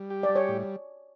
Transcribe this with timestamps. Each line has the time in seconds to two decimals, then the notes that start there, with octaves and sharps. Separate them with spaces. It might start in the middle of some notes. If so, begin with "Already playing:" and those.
Already playing: G3
0.10 G4
0.23 D5
0.29 G3
0.36 C#5
0.49 A2